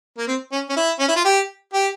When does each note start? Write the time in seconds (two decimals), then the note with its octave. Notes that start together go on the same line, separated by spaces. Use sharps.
0.17 A#3
0.27 C4
0.52 C#4
0.69 C#4
0.76 E4
0.99 C#4
1.08 E4
1.16 F4
1.25 G4
1.73 G4